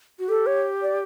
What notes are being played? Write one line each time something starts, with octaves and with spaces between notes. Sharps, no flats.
F#4
G4 A4
C#5
D5